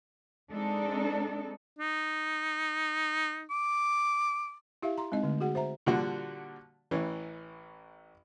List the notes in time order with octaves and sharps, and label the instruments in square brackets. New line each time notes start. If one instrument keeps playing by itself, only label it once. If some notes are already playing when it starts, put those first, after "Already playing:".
[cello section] G#3 C4 D4 D#4 A4
[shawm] D#4
D6
[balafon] E4 G4 E5 F5
A#5 C6
G#3 C4 D#4 D#5
D3 A3
F#4 G#4 F#5
C5 E5 A#5
[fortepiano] A#2 D3 F3 G3 F#4
A1 E3 C#4